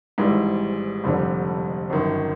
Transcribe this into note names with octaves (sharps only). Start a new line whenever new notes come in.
G#1 G#2 E3 G3
F1 F2 D3 G3
G1 F#2 D#3